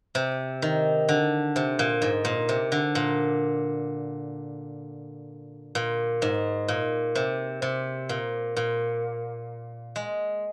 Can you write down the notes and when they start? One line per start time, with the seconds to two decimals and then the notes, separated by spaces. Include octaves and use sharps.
0.15 C3
0.62 D#3
1.09 D3
1.56 C3
1.79 A#2
2.02 G#2
2.25 A#2
2.49 C3
2.72 D3
2.95 A#2
5.75 A#2
6.22 G#2
6.68 A#2
7.15 C3
7.62 C3
8.09 A#2
8.57 A#2
9.96 G#3